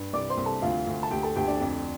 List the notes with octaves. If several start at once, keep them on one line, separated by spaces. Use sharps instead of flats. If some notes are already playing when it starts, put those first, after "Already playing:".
Already playing: G2
C2 D5 D6
C5 C6
C2
A4 A5
D2 F4 F5
D2
A5
D2 G4 G5
A4 A5
D2 G4 G5
D4 D5
F2